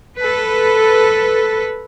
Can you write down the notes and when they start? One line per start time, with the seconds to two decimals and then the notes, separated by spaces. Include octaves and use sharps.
0.19 A4 B4